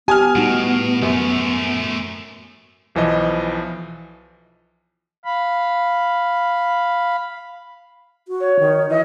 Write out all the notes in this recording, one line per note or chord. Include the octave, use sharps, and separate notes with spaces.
B3 G4 G#5 D#6 F6
A2 G3 D#4 F#4
F#2 A3 C#4
B1 E3 F3 D#5
F5 B5
F#4
C#5
D#3
E3 D#5